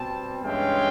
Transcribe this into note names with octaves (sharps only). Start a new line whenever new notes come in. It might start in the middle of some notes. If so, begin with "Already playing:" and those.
Already playing: B2 G3 C4 G5 A5
G2 E3 G#3 C#4 F5 G5